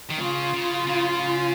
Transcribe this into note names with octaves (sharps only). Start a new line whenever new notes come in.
D#3
C#3 F4
C#3
C#3